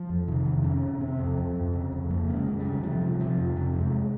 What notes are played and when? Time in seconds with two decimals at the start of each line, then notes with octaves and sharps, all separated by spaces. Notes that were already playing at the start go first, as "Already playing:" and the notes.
Already playing: F3
0.10 F2
0.28 C3 D#3
0.46 F2
0.64 C3 C#4
0.82 C3
1.00 C3 C4
1.19 F2
1.37 F2
1.55 F2
1.74 C#3
1.92 F2
2.10 F2 A#3
2.29 C#3
2.35 G#3
2.47 C#3
2.59 G3
2.65 C#3
2.75 D#3
2.83 C3 F3
3.01 C3
3.12 G3
3.20 C3 F3
3.38 F2
3.56 C3
3.74 F2
3.80 G#3